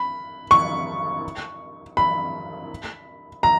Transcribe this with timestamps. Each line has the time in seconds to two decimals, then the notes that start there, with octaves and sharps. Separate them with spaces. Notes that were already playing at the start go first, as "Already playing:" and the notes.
Already playing: B5
0.51 C#6
1.97 B5
3.43 A#5